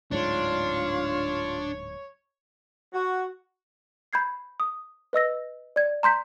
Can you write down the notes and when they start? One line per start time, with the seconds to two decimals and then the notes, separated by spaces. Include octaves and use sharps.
0.12 D1 G#2 D4 F4 C#5
2.93 F#4
4.13 B5 G6 G#6 C7
4.60 D#6
5.13 B4 D#5 E6 A#6
5.76 D5 G#6
6.03 A#5 C6 G6 B6